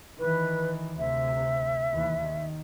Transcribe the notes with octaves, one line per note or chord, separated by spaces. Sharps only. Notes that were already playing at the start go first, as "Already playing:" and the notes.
D#3 E3 B4
D2 C3 E5
D#2 E3
D#3